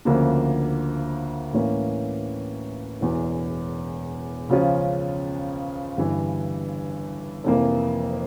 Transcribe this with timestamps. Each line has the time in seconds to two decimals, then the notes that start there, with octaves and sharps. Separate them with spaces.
0.05 D2 C#3 F3 A#3 D4
1.53 A2 E3 A#3 C#4
3.01 E1 E2 E3
4.49 C#2 C#3 F3 C#4 F4
5.97 G1 G2 E3
7.44 F1 F2 E3 A#3